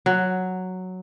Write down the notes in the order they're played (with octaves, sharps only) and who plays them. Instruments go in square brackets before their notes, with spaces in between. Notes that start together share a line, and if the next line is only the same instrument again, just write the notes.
[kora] F#3